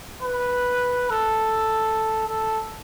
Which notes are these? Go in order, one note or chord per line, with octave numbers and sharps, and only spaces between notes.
B4
A4
A4